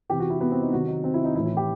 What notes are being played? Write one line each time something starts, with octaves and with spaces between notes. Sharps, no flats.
C3 E3 G4
F#4
E4
B3
C4
D#4
C3 D#3 F#3 F#4
D#4
C4
E4
D#4
A2 E3 E4
E4
G4